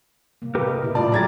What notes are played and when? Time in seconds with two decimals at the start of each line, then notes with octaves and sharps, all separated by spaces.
0.42 C3 A#3
0.55 G4 A#4 B4
0.67 D#5
0.82 A#2 C#3 E4
0.95 A2 F4 D5 A5
1.12 F#3 G#3 G4 A4 A#5 G#6 A6